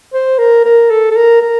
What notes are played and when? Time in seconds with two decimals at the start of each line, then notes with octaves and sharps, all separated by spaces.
0.13 C5
0.38 A#4
0.64 A#4
0.90 A4
1.11 A4
1.16 A#4
1.41 A#4